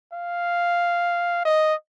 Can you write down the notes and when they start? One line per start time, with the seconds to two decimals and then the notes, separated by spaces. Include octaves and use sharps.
0.13 F5
1.45 D#5